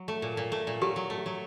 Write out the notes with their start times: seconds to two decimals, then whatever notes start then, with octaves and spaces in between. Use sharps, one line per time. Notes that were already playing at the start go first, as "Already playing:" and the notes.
Already playing: F#3
0.08 A3
0.22 A#2
0.37 A#2
0.52 A3
0.67 A#2
0.82 F#3 G4
0.96 F#3
1.10 A3
1.26 F#3